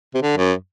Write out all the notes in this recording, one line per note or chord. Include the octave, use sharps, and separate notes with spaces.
C3
D3
F#2